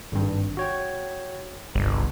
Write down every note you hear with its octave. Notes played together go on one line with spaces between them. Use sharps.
G#1 G2
F#4 C#5 G5
G1 C2